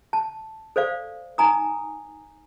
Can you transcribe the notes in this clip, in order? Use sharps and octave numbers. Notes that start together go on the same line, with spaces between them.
A5
A4 C5 D5 F5
D#4 G#5 A#5 D#6